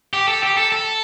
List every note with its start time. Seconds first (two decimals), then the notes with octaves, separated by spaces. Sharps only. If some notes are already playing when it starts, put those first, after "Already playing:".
0.13 G4
0.28 A4
0.43 G4
0.57 A4
0.72 A4